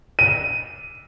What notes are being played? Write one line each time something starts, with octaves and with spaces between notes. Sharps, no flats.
D#7